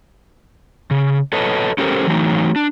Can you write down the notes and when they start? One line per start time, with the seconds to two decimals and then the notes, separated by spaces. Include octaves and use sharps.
0.91 C#3
1.33 A4 B4 C#5 D#5 A5
1.78 C#4 G4 A4 A#4 C5
2.07 E3 F#3 A3 D#4
2.56 D4